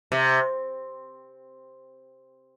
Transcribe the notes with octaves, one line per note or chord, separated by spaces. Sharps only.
C3